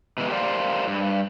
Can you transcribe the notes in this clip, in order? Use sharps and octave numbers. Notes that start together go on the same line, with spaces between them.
B2 E3 G#3
G4 A#4 C5 D5 E5 F5
G2